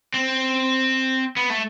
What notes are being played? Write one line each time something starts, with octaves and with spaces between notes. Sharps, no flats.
C4
B3
A3